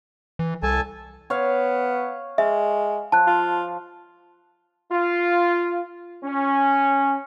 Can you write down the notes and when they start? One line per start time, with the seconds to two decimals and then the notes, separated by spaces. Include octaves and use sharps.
0.39 E3
0.63 C2 A4 G#5 A5
1.30 B3 C#5 F5
2.38 G#3 E5
3.12 F3 A5 F#6
3.27 F4
4.92 F4
6.24 C#4